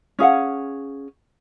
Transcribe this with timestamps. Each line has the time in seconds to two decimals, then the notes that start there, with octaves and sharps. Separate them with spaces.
0.19 C#4 G#4 F5 F#5